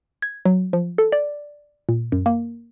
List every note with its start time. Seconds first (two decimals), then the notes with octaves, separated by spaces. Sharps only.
0.22 G#6
0.45 F#3
0.73 F3
0.98 A4
1.12 D5
1.89 A#2
2.12 F#2
2.26 A#3